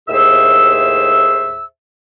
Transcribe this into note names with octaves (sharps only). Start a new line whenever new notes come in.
D#2 A2 G#4 C5 E5 E6